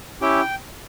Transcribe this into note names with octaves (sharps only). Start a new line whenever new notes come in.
C#4 E4 G4 G5